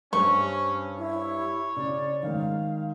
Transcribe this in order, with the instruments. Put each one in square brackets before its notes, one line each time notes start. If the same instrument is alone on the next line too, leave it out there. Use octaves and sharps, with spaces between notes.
[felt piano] G2 [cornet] C#4 [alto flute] C5 [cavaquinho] C#6
[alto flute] E4 [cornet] C#5
[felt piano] C#3 [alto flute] D5
[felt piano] G#2 D#3 [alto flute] F5